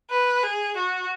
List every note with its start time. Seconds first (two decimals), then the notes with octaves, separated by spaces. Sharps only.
0.10 B4
0.44 G#4
0.77 F#4